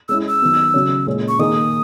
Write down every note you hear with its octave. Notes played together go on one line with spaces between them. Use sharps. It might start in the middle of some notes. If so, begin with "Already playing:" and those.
G#3 C#4 E4 E6
E6
D#3 F#3 B3
C#3 F#3 C#4
A#2 G#3 C#4
C#6
D#3 A#3 D#4 G#4 D#6